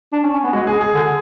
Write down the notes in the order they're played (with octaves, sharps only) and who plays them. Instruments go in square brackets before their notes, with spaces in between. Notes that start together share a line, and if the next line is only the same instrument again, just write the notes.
[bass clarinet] D4
C#4
C#4
B3
[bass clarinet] G#3 [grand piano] F#4
[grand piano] G#4
G#4
[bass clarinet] D3